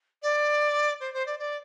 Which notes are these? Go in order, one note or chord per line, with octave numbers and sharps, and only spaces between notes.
D5
C5
C5
D5
D5